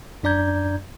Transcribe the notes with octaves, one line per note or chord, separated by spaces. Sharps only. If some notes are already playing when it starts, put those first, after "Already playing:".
F#2 D4 D5 A#5 G6 G#6